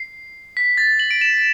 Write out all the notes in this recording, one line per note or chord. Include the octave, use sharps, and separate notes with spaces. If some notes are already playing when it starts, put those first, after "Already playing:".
Already playing: C7
B6
A6
F#7
D7
E7